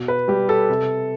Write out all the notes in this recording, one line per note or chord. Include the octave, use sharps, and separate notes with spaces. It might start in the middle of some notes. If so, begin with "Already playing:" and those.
Already playing: B2
B4
G3 G4
A4
C3